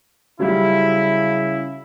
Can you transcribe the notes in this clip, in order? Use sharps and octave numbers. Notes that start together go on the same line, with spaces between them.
C#3 F#3 G3 E4 F4